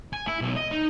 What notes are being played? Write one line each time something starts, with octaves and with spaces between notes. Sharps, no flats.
G#5
E4
B1
D#5
D#4